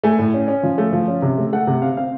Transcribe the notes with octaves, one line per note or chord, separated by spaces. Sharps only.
A3 G#5
A2
C#4
C#4
F3
A3
F3
C#4
C3
A3
A3 F#5
C3
C4 F5
C4 F5